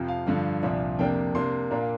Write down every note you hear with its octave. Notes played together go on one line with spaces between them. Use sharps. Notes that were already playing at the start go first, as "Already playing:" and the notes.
Already playing: F2 C3 F3
F5
G2 D3 F3
C2 A#2 F3 D4
F2 C3 A#3 D4 G5
C3 A#3 D4 C6
A#2 A#3 D4 A#5
F5